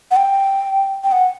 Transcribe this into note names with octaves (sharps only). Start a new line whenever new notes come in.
F#5
G5
G5
F#5